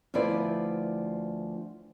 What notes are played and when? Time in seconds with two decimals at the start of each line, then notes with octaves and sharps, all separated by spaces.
0.14 D2 F3 E4 B4 D5